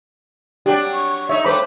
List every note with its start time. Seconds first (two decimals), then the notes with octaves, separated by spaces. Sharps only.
0.66 F#3 D4 G4 D5
0.93 C#6
1.29 D#4 C#5 E5
1.45 G2 A3 B4 C5 B5 D6